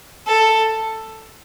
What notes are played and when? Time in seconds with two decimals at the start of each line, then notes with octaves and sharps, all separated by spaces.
0.27 A4